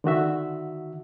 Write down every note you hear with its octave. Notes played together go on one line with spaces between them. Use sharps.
D3 D#3 F#4 E5